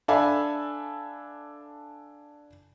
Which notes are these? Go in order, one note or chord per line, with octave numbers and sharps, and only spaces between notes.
D4 A4 E5 F5 G#5 B5